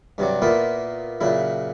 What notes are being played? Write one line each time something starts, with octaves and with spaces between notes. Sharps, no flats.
G2 C3 F#3 D5
A#2 A#3 B3 E4 F4
A#2 C#3 F#3 E4